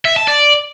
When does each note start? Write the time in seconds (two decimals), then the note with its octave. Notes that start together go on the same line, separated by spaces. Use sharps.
0.05 E5
0.16 A5
0.28 D5